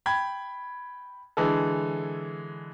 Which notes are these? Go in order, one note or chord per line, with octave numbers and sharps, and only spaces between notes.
G5 B5 G#6
D3 E3 G#3 A4